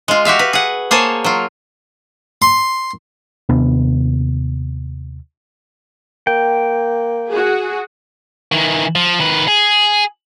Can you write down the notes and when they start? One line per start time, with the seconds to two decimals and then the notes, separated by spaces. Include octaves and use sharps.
0.08 G#3 F4
0.25 F#4 G4 E5 F5
0.39 B4
0.53 G#4 F#5
0.91 A#3 G#4 C5 C#5 G#5 A5
1.24 F#3 F4
2.42 C6
3.49 D#2 C3 B3 D4
6.27 A#3 G5
7.30 F#4 G#4
8.52 D#3 E3
8.95 F3
9.20 D#3 B4
9.48 G#4